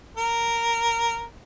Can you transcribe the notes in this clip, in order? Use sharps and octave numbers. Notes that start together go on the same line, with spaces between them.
A#4